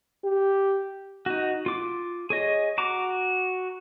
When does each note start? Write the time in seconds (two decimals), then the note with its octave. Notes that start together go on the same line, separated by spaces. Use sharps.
0.25 G4
1.26 D#4 F#4
1.66 F4 D6
2.30 G#4 C#5 D#5
2.78 F#4 A#5 D6